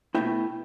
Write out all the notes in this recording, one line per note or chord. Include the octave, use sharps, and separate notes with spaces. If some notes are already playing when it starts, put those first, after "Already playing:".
B2 A3 E4 G5